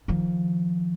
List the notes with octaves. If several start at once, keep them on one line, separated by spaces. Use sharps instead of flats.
D#3 F3